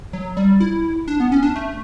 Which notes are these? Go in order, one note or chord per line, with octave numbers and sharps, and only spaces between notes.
F#3
G3
E4
D4
B3
C#4
D4
A3